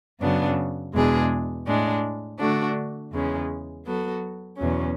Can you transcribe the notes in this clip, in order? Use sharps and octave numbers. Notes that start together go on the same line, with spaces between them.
F#2 C#3 F#3 B3 D4
E2 B2 G#3 D4 G#4
A2 G#3 D4
D3 A3 D4 F#4
E2 C#3 G#3 C#4
F#3 B3 F#4 A4
E2 B2 F#3 C#4